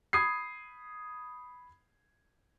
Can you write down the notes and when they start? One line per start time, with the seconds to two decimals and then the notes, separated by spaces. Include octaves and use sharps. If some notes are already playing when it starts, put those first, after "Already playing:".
0.13 B5 D#6 G#6 C7